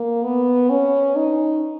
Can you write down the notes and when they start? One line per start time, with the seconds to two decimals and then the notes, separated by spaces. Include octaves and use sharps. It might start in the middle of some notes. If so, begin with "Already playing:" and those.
Already playing: A#3
0.24 B3
0.70 C#4
1.16 D#4